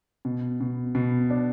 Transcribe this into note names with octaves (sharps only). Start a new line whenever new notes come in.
B2
B2
B2
D4